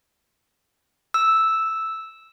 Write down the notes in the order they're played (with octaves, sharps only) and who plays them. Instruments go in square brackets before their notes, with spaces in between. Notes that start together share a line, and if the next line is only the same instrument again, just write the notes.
[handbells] E6